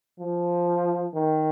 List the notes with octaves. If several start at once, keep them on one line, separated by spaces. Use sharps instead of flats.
F3
D#3